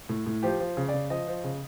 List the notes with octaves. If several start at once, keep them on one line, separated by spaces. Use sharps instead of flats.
A2
A2
F3 G4
F3
C#3
D5
C#3
F3 D#5
F3
C#3